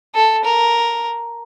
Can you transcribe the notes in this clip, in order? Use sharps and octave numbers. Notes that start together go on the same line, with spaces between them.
A4
A#4